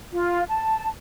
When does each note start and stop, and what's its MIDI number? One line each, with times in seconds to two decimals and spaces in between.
0.12 0.44 65
0.49 0.87 81